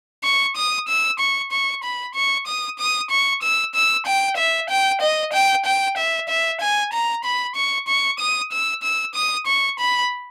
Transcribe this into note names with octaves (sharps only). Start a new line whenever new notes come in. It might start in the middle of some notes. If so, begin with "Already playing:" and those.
C#6
D#6
E6
C#6
C#6
B5
C#6
D#6
D#6
C#6
E6
E6
G5
E5
G5
D#5
G5
G5
E5
E5
G#5
A#5
B5
C#6
C#6
D#6
E6
E6
D#6
C#6
B5